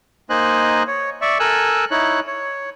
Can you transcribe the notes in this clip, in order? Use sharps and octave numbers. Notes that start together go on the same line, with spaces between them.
A#3 D#4 C5 D#5 G#5 F#6
C#5
D5 E5 C#6
A4 A#4 G#5 E6 F#6
D#4 E4 C#5 F#6
C#5